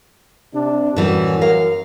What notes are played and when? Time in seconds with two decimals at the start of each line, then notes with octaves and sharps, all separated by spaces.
0.55 C3 D4
0.96 F#2 A2 E3 G3
1.41 A#4 F5